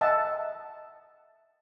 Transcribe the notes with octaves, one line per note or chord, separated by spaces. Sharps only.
D#5 E5 F#5 A5